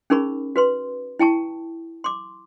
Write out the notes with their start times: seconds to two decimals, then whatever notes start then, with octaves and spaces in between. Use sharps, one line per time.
0.10 C#4 D#4 G#4 A#4 B5 C#6
0.56 F#4 B4 C6
1.19 E4 G5 A5 C#6
2.04 C6 D6